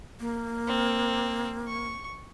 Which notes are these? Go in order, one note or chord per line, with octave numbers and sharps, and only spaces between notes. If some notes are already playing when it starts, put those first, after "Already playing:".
A#3
C4
C#6